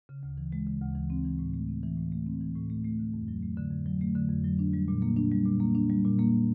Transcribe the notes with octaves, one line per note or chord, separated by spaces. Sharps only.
C#3
D2
E3
G#3
C#3
D2
E3
C4
E3
A2
A3
C4
E3
A2
A3
C4
E3
A2
A3
A3
D3
F2
F#3
A3
D3
F2
F#3
A3
D3
F2
F#3
D4
G3
A#2
A#3
D4
G3
A#2
A#3
D4
G3
A#2
A#3